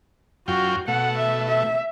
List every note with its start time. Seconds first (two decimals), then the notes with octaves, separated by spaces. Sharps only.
0.48 F#2 F4 F#4 G5
0.88 B2 A3 F#5
1.17 E5
1.48 E5